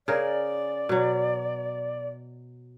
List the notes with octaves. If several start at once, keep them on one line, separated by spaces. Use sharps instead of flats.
C#3 G#4 A#4 D5
B2 F#3